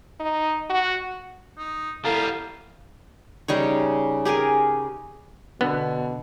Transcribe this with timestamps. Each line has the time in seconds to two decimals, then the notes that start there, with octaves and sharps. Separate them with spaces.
0.20 D#4
0.70 F#4
1.58 D#4
2.05 G3 B3 E4 A4 F5 A#5
3.48 C#3 G3 D#4 C#5
4.25 G4 G#4 A#4 G#5
5.61 B2 D3 B3